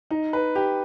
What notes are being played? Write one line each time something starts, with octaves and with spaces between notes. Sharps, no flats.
D#4
B4
G4